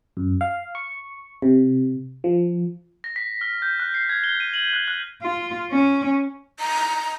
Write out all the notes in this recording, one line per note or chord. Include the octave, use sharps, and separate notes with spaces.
F#2
F5
C#6
C3
F3
A#6
B6
F6
G6
F#6
C7
G#6
G7
D#7
F#7
F#6
F#6
F4
C#4
A#5